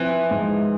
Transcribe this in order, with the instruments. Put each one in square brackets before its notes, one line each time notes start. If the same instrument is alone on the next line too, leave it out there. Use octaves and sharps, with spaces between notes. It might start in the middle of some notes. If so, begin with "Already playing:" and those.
Already playing: [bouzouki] E3 [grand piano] F3 C4
[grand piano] G#2